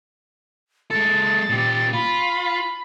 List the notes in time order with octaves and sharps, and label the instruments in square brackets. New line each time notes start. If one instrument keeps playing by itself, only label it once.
[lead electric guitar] G#3 A4 [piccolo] A6
[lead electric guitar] A#2 G4
[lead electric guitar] F4 [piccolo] B5